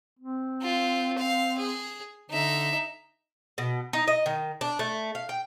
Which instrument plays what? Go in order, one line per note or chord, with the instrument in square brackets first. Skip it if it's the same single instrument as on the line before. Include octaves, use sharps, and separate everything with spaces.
[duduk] C4
[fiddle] F4
F5
G#4
[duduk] D3 [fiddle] D#4 E5
[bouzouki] B2
D#4
D#5
D#3
D4
A3
F5
G5